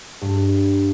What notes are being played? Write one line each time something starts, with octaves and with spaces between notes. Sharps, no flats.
G2